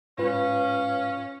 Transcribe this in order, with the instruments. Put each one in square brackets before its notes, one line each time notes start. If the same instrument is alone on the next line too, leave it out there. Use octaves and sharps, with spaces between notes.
[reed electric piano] G#2 F4 B4 [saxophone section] C#4 [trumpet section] F5